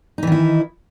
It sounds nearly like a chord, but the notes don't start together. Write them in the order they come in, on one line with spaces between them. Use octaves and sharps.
D#4 E3 D#3 E4